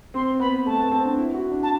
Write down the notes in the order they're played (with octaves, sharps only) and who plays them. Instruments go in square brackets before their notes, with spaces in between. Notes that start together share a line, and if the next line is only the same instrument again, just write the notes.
[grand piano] C4 [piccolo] C6
[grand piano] B3 [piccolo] B5
[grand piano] A3 [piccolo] A5
[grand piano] B3
C4
D4
E4
F#4
D4
[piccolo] A5